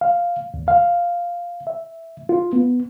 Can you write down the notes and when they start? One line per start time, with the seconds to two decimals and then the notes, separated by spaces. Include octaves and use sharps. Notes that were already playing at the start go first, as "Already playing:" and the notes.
0.01 F5
0.54 D#2
0.68 F5
1.67 E5
2.29 F4
2.53 B3